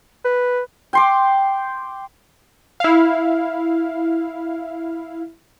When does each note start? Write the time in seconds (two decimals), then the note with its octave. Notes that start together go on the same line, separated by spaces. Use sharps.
0.24 B4
0.93 G5 C6 D6
2.80 E4 F5